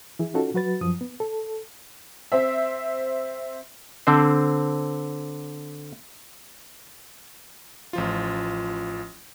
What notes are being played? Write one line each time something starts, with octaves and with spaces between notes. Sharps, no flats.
E3 E4 G#4
C#4 D#4 F4 F#4 A4
F#3 F#4 B4 A6
F#2 F3 D#6
B3
A4
C4 E5
D3 C4 C5
A1 F3 F4